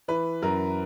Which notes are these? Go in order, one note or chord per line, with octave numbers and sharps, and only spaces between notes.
E3 B4
F#2 A#4